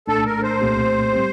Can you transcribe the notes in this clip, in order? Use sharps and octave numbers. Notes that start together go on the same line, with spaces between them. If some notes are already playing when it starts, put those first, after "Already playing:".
C2 A#2 A3 D4 A4
A#4
C5
C2 A#2 A3 C4 G4
A2 G3 C4 G4